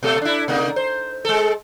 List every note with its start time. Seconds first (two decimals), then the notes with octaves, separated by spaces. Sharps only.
0.03 B2 A3 A4
0.22 D4 E4
0.48 C3 A#3 D#4
0.76 C5
1.25 G#3 A4